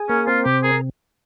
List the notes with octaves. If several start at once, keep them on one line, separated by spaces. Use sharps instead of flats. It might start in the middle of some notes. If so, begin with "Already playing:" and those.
Already playing: G#4
A#3 C#4
C4 F4
C3 G4
G#4 A#4